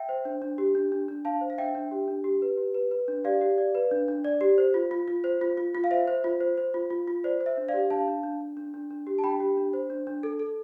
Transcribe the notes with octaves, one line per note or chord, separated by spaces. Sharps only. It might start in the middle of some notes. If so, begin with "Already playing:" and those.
Already playing: E5 G5
C5
D4
D4
G4
D4
D4
D4
D4 F5 A5
C5
F5
D4 E5 G5
D4
G4
D4
G4
B4
G4
B4
B4
D4
G4 D5 F5
G4
D5
B4
D4
D4
D5
G4
C5
F4
F4
F4
C5
F4
F4
F4
F5
C5 E5
C5
F4
C5
C5
F4
F4
F4
C5 D5
C5
E5
D4
D5 F5
G4
D4 F5 A5
D4
D4
D4
D4
D4
D4
G4
A5
D4 G5 B5
G4
D4
C5
D4
D4
A4
A4